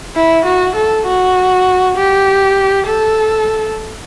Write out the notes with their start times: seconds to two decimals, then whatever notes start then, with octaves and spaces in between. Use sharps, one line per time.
0.16 E4
0.45 F#4
0.76 A4
1.07 F#4
1.97 G4
2.87 A4